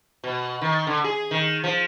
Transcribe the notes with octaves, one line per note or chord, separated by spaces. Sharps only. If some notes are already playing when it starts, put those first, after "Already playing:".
B2
D#3
D3
G#4
D#3
F3